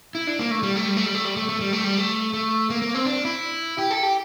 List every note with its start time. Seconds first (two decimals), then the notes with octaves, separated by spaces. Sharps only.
0.15 E4
0.27 D4
0.39 A#3
0.51 A3
0.63 G3
0.76 A3
0.88 G3
0.97 A3
1.06 G3
1.15 A3
1.25 G3
1.37 A3
1.49 A3
1.61 G3
1.73 A3
1.84 G3
1.97 A3
2.34 A3
2.70 A#3
2.82 A#3
2.95 C4
3.06 D4
3.25 E4
3.78 G4
3.91 A4
4.03 G4